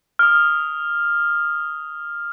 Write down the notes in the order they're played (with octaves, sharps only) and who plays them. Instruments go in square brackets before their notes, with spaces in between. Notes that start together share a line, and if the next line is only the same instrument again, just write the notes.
[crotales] D#6 F6